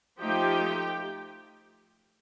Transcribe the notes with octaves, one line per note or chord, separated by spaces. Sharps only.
F3 A3 D#4 G4 G5